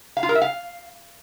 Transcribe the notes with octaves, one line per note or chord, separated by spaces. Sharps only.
F5
F4
A#4
E5
F5